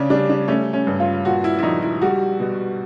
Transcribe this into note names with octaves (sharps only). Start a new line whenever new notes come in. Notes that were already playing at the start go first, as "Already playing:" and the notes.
Already playing: C#3 C#4 D4
G3 D4
D4
A3 C#4
C#4
G2
F4
A#2 F#4
E4
E4
A#1 D#4
E4
G3 F#4
B2